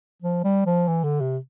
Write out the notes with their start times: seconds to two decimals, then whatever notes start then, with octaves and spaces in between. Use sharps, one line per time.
0.22 F3
0.44 G3
0.66 F3
0.87 E3
1.04 D3
1.20 C3